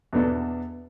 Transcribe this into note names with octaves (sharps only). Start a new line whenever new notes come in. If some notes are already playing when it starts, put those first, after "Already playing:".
E2 B2 B3 D4 A4